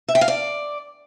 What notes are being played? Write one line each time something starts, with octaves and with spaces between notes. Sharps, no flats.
E5
G5
F5
D5